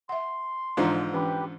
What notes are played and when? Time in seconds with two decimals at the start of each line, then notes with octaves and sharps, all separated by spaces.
0.09 E5 F#5 C6
0.77 G#2 D3 E3 F3 C5 A#5
1.14 E3 C#4 D4 G4 B4